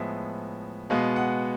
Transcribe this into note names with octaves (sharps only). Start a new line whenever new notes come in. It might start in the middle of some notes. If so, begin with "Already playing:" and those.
Already playing: A2 F3 G#3 B3 E5
B2 G#3 B3 F5
F#5